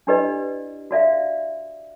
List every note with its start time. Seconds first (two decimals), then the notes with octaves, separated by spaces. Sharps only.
0.07 D4 E4 G4 B4 D5 D#5
0.91 F#4 D5 E5 F5